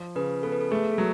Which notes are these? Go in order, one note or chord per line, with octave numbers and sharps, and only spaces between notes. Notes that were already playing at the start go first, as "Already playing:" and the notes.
Already playing: F3
C#3 B4
B3 A4
B4
A4
A3 G#4
A4
F#3